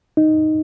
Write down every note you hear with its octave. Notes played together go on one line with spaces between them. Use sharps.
D#4